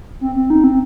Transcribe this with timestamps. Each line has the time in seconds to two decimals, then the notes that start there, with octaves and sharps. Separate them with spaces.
0.21 C4
0.35 C4
0.50 D#4
0.64 C4